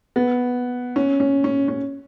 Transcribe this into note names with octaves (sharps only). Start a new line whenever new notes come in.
B3
C#4
C#4
C#4
C#4